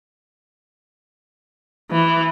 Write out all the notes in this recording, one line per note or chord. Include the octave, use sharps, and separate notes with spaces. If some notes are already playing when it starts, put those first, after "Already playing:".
E3